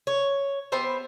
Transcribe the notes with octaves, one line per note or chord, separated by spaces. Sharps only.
C#5
B3 G4 C5 E5